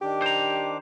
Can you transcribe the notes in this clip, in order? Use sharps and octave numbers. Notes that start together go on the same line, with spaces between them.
D#3 D4 G4 D6
C5 A#5